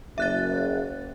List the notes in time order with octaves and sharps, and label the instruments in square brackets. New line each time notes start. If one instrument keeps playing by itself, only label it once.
[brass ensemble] F#1 [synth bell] E5 F#6 A6